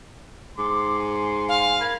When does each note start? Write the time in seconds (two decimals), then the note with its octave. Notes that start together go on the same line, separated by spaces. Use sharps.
0.58 G#2 C6 D6
0.98 G#5
1.49 F5 G#5
1.81 A#4 B5 G#6